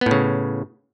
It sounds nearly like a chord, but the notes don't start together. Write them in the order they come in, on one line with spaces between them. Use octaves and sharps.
B3 A2 C#3